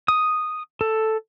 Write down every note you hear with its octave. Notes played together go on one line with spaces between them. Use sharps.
D#6
A4